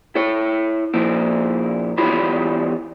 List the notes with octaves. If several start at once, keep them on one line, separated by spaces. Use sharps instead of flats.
E4 C#5
A#2 F3 E4
E2 G3 E4 F4 C#5 B5